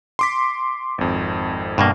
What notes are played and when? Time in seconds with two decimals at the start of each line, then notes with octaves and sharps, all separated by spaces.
0.19 C6 D6 B6
0.98 G#1 F2
1.78 G2 B2 A#3